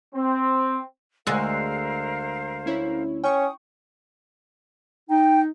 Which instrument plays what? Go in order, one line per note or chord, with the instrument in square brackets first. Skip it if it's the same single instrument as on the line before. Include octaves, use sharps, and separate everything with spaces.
[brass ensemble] C4
[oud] D2 G#3 [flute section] A#4 C5 F5 [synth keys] E6 F#6 C7
[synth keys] C#4 E4 C#5
[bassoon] C#4 [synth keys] G5 C#6 [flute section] D#6
[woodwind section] D#4 [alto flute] G5